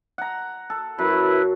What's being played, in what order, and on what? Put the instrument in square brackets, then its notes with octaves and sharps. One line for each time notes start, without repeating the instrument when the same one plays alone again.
[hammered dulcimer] F#5 A#5
A4
[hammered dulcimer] F#2 [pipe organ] E4 B4